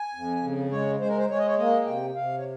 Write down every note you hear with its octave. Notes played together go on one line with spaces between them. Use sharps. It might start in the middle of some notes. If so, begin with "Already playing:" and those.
Already playing: G#5
F2
C#3
G#3 C#5
G#3 C5
A#4
C5
G#3 C#5
D#5
C#5
A#3 D#5
C3 G5
C3 F5
C#5